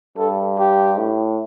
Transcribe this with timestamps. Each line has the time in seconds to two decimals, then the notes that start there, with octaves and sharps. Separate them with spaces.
0.17 G2 A4
0.58 G4
0.98 A2